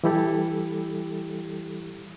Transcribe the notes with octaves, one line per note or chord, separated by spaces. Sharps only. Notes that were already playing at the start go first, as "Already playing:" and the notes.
E3 G3 E4 G4 A4